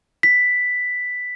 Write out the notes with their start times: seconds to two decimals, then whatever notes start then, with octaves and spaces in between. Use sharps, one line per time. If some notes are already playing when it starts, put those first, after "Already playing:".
0.23 B6